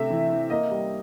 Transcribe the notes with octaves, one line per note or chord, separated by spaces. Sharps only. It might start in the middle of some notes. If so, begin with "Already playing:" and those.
Already playing: C3 A3 C4 E5
E3
E3
A#3 D#5
G3